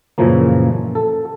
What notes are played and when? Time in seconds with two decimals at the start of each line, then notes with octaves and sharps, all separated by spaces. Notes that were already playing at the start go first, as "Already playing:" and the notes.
0.18 F#2 A#2 C#3 E3 F3 A#3
0.95 A4